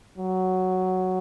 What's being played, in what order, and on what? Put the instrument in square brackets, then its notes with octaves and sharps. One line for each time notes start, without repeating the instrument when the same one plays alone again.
[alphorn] F#3